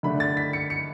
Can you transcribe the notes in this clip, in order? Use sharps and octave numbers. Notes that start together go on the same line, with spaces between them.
D3 A3 D4 B5
A6
B6
C#7
C#7